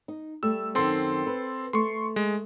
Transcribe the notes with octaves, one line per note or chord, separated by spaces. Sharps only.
D#4
G3 A3 E6
F#2 D#3 C4 A4 C6
B4
A3 C6 C#6
G#3